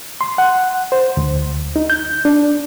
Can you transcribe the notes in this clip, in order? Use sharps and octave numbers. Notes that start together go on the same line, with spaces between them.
C6
F#5
C5
D2
D#4
G6
D4